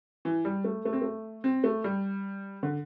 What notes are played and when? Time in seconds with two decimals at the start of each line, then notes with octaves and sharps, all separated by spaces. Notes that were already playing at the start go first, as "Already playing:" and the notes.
0.25 E3
0.45 G3
0.64 A3
0.85 A3
0.93 C4
1.02 A3
1.44 C4
1.64 A3
1.84 G3
2.63 D3